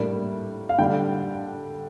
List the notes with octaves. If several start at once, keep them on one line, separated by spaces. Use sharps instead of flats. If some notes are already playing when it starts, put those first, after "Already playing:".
Already playing: A2 G3 A#3 D4
F5
D3 G3 D4 G5